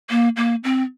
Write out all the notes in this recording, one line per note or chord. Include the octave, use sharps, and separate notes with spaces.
A#3
A#3
C4